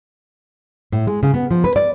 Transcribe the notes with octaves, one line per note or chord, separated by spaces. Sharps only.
A2
G#3
C#3
B3
F3
B4
D5